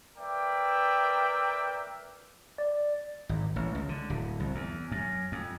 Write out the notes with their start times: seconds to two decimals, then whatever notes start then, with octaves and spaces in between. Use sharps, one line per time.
0.17 A#4 B4 D5 E5 G5
2.58 D5
3.29 G#1
3.56 A1
3.75 C#2
3.89 D3
4.10 D1
4.40 C2
4.55 E2
4.92 F#2
5.32 F2